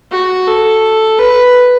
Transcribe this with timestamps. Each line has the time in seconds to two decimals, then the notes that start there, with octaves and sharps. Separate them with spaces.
0.12 F#4
0.47 A4
1.19 B4